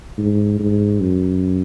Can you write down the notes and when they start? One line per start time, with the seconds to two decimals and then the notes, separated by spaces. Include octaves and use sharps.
0.18 G#2
0.59 G#2
1.00 F#2